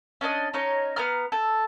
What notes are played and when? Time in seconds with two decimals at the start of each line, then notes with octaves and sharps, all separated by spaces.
0.21 C#4 D4 B4 D#5
0.54 C#4 D#4 C#5
0.96 B3 A#5 F6
1.32 A4